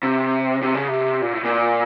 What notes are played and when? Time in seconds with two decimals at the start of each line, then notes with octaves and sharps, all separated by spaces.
0.03 C3
0.62 C3
0.74 C#3
0.88 C3
1.21 A#2
1.33 A2
1.44 A#2